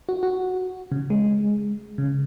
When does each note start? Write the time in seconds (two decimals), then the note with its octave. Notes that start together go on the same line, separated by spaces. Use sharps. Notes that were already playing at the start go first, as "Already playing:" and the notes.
0.09 F#4
0.23 F#4
0.92 C#3
1.10 G#3
1.98 C#3